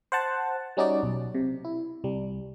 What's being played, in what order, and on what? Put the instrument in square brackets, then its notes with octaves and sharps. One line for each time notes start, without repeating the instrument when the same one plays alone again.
[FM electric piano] C5 F#5 A5
G3 C#4 D#4 F#4 D5
B1
C3
E4
C2 G3